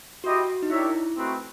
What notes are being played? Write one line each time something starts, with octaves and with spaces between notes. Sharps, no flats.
E4 F#4 G4 C5 D#5
D#4
D4 E4 G4 A#4 C#5 E5
A3 C4 D#4 F#4 B4